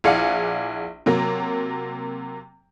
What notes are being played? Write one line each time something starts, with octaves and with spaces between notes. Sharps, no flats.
A#1 E4 G#4 D5 F5 F#5
C3 F#3 A#3